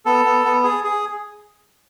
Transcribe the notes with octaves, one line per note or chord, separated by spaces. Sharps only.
B3 A4
B3
B3
G#4
G#4